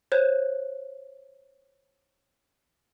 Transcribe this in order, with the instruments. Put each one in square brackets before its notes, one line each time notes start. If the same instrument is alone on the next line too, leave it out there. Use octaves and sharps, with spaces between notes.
[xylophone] C5 C#5 F#6